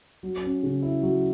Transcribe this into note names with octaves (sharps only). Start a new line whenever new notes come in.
F#3
C#4
C#3
E4
F#3